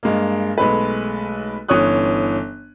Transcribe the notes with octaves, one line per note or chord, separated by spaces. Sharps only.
G2 G#3 A#3
B1 G#3 A3 B4
G1 E3 C#4 C#5 D#6 F#6